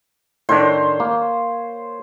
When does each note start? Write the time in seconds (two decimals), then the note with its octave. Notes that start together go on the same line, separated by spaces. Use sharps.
0.49 A2 D#3 D4 C5 C#5
1.00 A#3